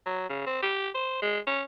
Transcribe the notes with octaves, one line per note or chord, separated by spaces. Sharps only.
F#3
C#3
C4
G4
C5
G#3
C#4